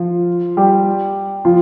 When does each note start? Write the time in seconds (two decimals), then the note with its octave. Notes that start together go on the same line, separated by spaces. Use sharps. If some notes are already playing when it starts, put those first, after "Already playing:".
Already playing: F3 F4
0.57 G3 G4
1.45 F3 F4